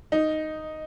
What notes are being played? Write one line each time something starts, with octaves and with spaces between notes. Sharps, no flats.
D#4